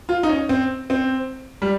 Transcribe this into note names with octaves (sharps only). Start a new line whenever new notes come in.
F4
D#4
C#4
C4
C4
G3